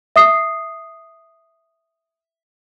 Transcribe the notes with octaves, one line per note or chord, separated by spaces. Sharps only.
E5 D#6 C7